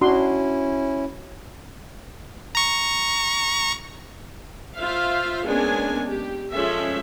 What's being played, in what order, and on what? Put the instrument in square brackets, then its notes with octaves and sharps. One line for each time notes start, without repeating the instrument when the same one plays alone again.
[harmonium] C#4 E4 [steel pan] D4 F#4 C6
[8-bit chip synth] A#5 C#6
[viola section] F4 C5 E5 F5
G#3 A#3 B3 C#4 D4 G#5
G4
F3 G#3 C#4 A4 E5